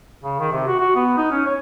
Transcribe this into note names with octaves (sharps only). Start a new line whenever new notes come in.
C#3
D#3
C3
F#4
F#4
B3
D#4
C#4
C#5